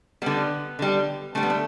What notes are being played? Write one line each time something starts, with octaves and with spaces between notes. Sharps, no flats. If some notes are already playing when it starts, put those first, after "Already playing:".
D3 G3 B3
D3 G3
D3 G3 A3
B3
A3